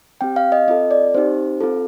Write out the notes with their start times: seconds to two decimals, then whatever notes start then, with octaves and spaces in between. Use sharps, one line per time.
0.21 C4 G4 G5
0.36 F5
0.52 D#5
0.68 C4 F4 A4 D#5
0.91 D5
1.14 C4 D#4 G4 C5
1.61 C4 F4 A4